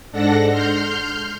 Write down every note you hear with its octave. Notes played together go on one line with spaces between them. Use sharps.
G#2 D4 A4 F#5 A#6
C6 F6 G6